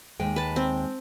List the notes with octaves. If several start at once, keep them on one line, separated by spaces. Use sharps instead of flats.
D#2 G#3 G5
B4 A5
C4